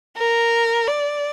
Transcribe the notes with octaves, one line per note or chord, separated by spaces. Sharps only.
A#4
D5